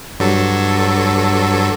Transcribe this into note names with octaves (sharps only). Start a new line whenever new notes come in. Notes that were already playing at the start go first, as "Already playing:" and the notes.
G2 F#3 A4